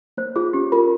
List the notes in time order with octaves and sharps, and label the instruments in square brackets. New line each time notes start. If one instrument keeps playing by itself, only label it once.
[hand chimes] A#3 [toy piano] C5
[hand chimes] F4 [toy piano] G#4
[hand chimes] C#4 [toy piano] G4
[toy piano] F4 [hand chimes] A#4